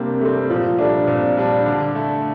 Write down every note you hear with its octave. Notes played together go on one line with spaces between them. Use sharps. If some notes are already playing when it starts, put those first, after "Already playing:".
Already playing: C3 G3 A#3 C4 D4
G3 A3 C4
A#2 F3
G3 A3 D4
A#2 C4
G3 D4
D3 D4
A3 E4